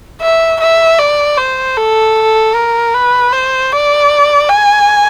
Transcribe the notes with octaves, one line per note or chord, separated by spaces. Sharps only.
E5
E5
D5
C5
A4
A#4
B4
C5
D5
G#5